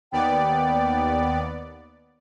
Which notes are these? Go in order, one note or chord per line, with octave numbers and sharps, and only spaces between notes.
D#2 B3 D5 G5